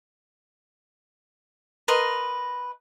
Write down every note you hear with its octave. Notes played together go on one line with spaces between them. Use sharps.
A#4 B4 D#5 C6